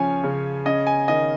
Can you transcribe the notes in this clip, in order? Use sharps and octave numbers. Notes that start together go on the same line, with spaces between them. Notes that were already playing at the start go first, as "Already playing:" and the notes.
Already playing: C#3 F3 C#4 C#5 G#5
C#3
C#4 D#5
G#5
D#3 D#5